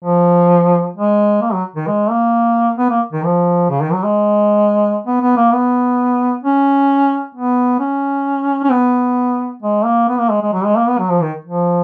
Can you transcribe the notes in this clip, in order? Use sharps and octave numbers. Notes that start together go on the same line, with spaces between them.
F3
G#3
A#3
F#3
D#3
G#3
A#3
B3
A#3
D#3
F3
C#3
D#3
F#3
G#3
B3
B3
A#3
B3
C#4
B3
C#4
C#4
B3
G#3
A#3
B3
A#3
G#3
G#3
F#3
G#3
A#3
B3
F#3
F3
D#3
F3